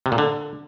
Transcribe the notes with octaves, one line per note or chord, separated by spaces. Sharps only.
C3
A#2
D3